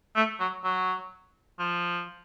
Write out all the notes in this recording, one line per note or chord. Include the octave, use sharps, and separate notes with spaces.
A3
F#3
F#3
F3